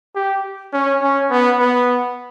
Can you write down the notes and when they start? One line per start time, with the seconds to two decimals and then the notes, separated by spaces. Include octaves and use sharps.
0.16 G4
0.73 C#4
1.02 C#4
1.30 B3
1.59 B3